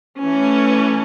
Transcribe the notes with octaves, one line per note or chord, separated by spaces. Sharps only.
E3 A3 C#4